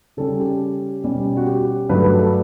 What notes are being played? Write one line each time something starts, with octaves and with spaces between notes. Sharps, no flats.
C#3 G3 C#4 A4
G4
B2 G3 C#4
F#4
G4
G2 F#3 A3 B4
B4
A4